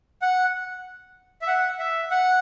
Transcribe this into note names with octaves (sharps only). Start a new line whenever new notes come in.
F#5
E5
F#5
E5
F#5